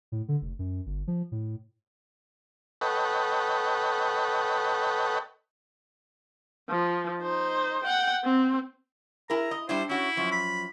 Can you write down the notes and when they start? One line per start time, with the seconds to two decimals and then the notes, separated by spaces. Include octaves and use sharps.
0.12 A2
0.28 D3
0.41 F1
0.59 F#2
0.86 G1
1.07 F3
1.32 A2
2.81 A4 B4 C#5 D#5 F#5 G5
6.69 F3
7.21 D#4 C5
7.84 F#5 G5
8.24 C4
9.30 E4 G#4 A#4 A#5
9.51 D#5
9.69 G3 D4 E4 C5
9.89 C#4 E4 F#4
10.17 F#2 F3
10.32 B5